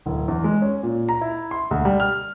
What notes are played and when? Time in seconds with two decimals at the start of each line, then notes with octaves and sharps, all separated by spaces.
0.06 D1
0.28 E2
0.44 G#3
0.62 C#4
0.83 A#2
1.09 A#5
1.21 E4
1.51 C6
1.71 D2
1.85 G3
2.00 F6